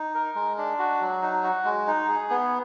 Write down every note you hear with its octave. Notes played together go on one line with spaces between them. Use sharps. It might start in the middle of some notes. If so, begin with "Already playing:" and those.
Already playing: D#4
A#4
G#3
D4
F#4
F#3
D#4
F#4
G#3
D#4
G#4
B3